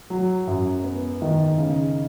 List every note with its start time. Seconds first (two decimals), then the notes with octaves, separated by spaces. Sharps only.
0.10 F#3
0.47 F#2
0.84 B3
1.22 D#3
1.58 C#3